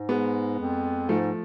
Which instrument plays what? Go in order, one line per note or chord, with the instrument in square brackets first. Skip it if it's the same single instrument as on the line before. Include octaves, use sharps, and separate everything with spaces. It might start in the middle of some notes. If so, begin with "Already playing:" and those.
Already playing: [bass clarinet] G#2
[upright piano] G#3 B3
[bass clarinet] F2
[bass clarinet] G#2 [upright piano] F3 A3